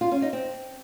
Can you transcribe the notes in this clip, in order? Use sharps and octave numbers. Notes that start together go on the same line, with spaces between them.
F4
C#4
D#4
C4